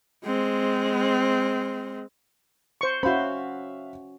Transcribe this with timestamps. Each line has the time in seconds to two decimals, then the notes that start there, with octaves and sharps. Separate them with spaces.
0.25 G#3 C4
2.81 C5 C#6
3.03 C#4 F#4 C5 E5 F5 B5